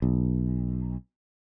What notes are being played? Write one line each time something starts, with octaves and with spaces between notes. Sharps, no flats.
B1